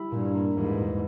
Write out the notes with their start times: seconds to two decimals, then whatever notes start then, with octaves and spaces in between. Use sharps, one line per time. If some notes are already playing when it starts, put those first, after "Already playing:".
Already playing: G3 E4
0.11 G2 A#2
0.35 A#3
0.57 E2 G#2
0.80 E2